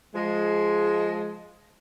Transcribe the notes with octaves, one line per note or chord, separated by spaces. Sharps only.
F3 G#3